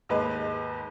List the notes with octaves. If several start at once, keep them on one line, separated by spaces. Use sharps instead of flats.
D#2 G#2 G#3 B4